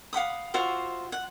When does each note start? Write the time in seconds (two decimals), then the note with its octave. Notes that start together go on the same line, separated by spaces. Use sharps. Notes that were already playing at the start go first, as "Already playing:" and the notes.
0.13 F5 F#5 B5 D#6
0.54 F4 F#4 C5 E5
1.12 F#5